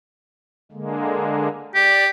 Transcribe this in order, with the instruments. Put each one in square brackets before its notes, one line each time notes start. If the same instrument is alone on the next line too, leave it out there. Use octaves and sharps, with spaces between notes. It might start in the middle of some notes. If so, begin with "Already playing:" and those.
[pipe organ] D3 G#3 A#3
[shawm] G4 [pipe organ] D5